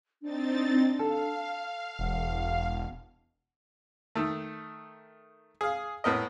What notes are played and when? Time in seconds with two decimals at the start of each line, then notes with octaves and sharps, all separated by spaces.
0.22 C4 D4 D#4 A6
0.99 A4 F5
1.99 E1 F#5
4.15 D#3 A3
5.61 G#4 F5
6.04 A2 B3 A#4 D#5